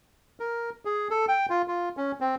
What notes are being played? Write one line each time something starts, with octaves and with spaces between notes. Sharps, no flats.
A#4
G#4
A4
G5
F4
F4
C#4
C4